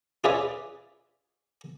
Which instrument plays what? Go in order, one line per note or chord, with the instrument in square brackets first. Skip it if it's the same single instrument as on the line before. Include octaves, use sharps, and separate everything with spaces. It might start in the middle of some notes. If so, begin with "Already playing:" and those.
[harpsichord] F4 G#4 B4 C#5 D5 E5